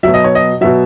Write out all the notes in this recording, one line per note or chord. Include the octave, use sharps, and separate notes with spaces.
B2 F#3 E5
D#5
C#5
D#5
B2 F#3 E5